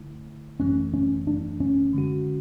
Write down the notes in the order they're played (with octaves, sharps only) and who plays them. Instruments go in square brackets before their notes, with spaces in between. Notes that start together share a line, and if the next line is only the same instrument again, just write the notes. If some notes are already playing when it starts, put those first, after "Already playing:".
Already playing: [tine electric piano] D3 A3 E4
[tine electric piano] G#1 F#2 E3 A3 [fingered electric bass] C#4
[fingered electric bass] C#4
D4
C#4
[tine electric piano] D3 G#3 C#4 F#4